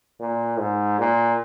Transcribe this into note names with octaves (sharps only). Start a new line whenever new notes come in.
A#2
G#2
A#2